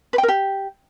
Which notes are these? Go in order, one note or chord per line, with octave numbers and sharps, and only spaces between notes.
B4
G5
A#4
G4